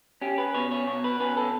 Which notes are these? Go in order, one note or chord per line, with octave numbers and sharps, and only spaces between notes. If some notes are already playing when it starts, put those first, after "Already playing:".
C#4 G4
B4
B2 C#5
C#5
B2 C#5
B4
C#4 B4
A4